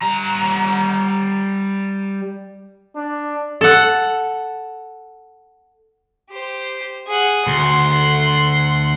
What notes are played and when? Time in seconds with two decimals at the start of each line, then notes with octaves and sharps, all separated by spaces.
0.02 G3 A#5
2.96 D4
3.61 A4 F#5
6.31 G4 C5
7.07 G#4 F#5
7.47 D2 F#5 C6